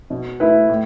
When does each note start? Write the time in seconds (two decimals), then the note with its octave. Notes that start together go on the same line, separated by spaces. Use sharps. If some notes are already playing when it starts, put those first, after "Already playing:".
0.10 B2
0.40 A3 E4 B4
0.69 A2